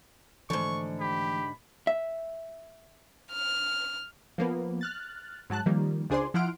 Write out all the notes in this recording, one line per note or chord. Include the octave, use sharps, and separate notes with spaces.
G#2 D3 E3 F3 A3 C#6
G4 B5
E5
F6
F3 A#3 B3
F6 F#6 A6
G#2 F#3 A5 F#6
D#3 F3 G3 A#3
C#2 D4 G#4 C5 D5 C6
F3 E4 F#5 C6 F6 D7